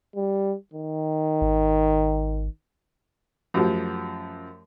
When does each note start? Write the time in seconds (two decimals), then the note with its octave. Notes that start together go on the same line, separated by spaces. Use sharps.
0.16 G3
0.74 D#3
1.42 G#1
3.54 F#2 F3 A3 F#4 G4